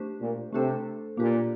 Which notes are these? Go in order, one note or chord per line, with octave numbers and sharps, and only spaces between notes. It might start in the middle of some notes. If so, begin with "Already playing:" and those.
Already playing: A3 D4 G4 C5
A#2
C3 A3 D4 A4 C5
A#2 A#3 D4 G4